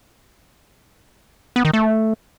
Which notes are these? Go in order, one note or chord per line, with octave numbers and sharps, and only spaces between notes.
B3
D#3
A3